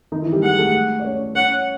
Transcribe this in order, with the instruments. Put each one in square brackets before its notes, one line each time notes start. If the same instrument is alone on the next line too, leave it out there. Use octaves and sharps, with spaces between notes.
[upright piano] D#3 D#4
E3 E4
G3 G4
[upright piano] G#3 G#4 [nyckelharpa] F#5
[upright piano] A3 A4
D5
C#4 C#5
[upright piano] C#4 C#5 [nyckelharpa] F#5